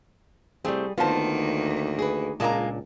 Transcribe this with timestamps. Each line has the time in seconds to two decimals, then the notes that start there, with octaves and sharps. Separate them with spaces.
0.65 C2 G3 A3 C4 G#4
0.98 D2 D#3 A#3 B3 F4 C5 A5
1.99 G#4 B4
2.40 C#2 A#2 G#3 A#3 D4 A5 A#5